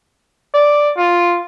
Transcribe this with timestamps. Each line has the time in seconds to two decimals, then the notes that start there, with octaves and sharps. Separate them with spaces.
0.54 D5
0.98 F4